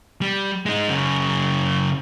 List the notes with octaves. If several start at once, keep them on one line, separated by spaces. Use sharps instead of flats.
G3
G#3 D#4
F#2 C#3